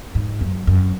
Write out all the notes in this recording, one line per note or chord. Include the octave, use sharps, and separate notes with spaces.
G#2
F#2
F#2